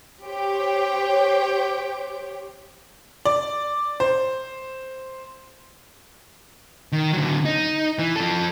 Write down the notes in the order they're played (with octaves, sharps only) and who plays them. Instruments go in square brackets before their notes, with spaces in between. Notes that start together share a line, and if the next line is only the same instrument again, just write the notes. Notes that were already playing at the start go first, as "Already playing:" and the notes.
[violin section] G4 C5 C#5 G5
[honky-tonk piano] D5
C5
[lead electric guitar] D#3
D3 F#3
D#4
E3
F3 A4